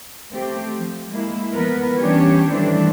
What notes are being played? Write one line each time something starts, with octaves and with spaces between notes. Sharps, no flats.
A3 C4 G4
F3
G#3 A#3 E4
F3 B3 A#4 B4
E3 G3 C#4 D4 G4 C#5
D#3 E3 G3 A3 C4 D4